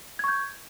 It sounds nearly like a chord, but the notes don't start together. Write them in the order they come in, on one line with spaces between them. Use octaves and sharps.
G#6 C#6 G6